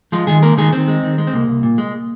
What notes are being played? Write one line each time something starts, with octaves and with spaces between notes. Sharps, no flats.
F3 G#3 F4
D#3 G#3 G#4
G#3 A#3 A#4
D#3 G#3 G#4
D#3 C4
G#3
D#3
G#3
C4
C2 A#3
C2
A#2
G#3